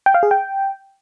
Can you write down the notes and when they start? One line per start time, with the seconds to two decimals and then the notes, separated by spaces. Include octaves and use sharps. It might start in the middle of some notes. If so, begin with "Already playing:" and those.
0.06 G5
0.14 F5
0.23 G#4
0.31 G5